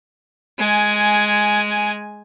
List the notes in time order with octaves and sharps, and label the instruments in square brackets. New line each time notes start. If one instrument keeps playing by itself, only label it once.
[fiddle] G#3 G#5